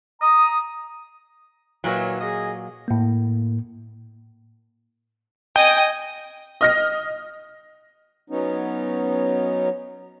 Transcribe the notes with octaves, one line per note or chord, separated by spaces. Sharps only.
A#5 D#6
A#2 D#3 E3 F#3 C#5
G#4 D#5
A2 A#3
D#5 G5 G#5
D#5 F6 A#6
F#3 B3 C#4 D#4